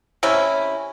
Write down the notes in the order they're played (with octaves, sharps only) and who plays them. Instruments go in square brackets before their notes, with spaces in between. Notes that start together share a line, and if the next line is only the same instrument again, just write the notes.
[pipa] C3 C#4 E4